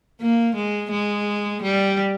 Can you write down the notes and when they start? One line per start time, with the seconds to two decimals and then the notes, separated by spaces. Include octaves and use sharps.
0.21 A#3
0.56 G#3
0.91 G#3
1.62 G3